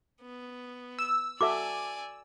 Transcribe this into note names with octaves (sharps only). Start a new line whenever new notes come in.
B3
E6
F#4 A4 D5 E5 G#5 D6